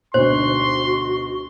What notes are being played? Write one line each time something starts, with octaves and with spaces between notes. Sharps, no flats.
D2 G#2 B2 F#4 C5 C6